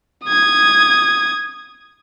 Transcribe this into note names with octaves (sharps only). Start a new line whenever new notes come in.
D#6 G#6